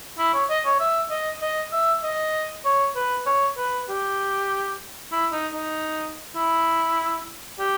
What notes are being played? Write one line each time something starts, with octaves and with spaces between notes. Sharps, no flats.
E4
C#5
D#5
C#5
E5
D#5
D#5
E5
D#5
C#5
B4
C#5
B4
G4
E4
D#4
D#4
E4
G4